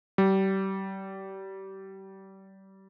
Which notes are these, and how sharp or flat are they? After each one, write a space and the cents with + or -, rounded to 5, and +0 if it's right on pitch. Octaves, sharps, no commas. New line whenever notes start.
G3 -30